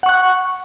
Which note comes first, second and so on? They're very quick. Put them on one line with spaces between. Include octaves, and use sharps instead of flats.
F#5 C#6 F#6